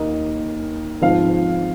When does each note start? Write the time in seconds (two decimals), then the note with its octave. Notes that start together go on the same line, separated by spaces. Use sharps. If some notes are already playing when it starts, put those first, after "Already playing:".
Already playing: D#2 D#3 A#3 D#5
1.01 G#2 F3 C4 F5